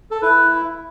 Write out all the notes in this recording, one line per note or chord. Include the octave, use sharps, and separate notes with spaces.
A4
E4 B4